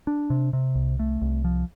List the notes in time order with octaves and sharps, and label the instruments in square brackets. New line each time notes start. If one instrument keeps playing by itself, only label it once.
[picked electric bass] D4
C3
C3
C2
A3
C2
F3